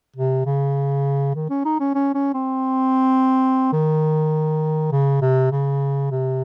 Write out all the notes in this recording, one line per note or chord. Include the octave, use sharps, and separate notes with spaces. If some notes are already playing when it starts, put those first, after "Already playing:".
C3
C#3
D#3
C#4
D#4
C#4
C#4
C#4
C4
D#3
C#3
C3
C#3
C3